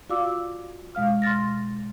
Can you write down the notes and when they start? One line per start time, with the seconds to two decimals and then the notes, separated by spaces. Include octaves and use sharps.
0.10 F4 F#4 D5 F5 D6 E6
0.95 B2 G#3 F5 F6
1.22 C6 F6 A6 A#6